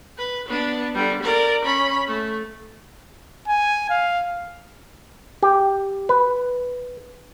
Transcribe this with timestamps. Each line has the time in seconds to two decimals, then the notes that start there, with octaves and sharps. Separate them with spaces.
0.18 B4
0.48 B3 D4
0.94 D3 G3
1.23 A#4 D5
1.64 C#4 B5
2.07 A3
3.48 G#5
3.90 F5
5.43 G4
6.09 B4